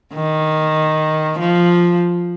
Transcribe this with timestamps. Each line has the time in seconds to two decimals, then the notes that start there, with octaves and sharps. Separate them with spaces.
0.14 D#3
1.39 F3